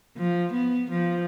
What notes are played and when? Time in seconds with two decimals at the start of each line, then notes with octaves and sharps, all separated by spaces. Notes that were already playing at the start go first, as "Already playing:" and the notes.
0.16 F3
0.53 B3
0.91 F3